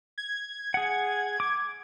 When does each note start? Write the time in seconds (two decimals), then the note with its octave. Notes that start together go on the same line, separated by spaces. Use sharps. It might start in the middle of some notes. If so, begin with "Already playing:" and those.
0.18 G#6
0.74 G#4 F#5
1.40 D6